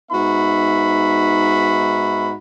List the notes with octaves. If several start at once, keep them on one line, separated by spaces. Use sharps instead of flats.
G#2 B3 D#4 F#4 E5 B5